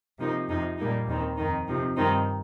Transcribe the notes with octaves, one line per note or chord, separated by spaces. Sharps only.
C3 F3 A#3 D#4
F2 C3 F3 D#4
A#2 G3 A#3 D#4
D#2 D#3 C4 D#4
F2 D#3 C4 D#4
C3 F3 D#4
G2 D#3 C4 D#4